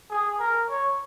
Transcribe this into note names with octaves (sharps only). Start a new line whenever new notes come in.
G#4
A#4
C#5